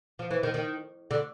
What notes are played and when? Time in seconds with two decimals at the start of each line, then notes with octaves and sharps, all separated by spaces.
0.19 F3
0.31 E3
0.43 D#3
0.54 D#3
1.11 D3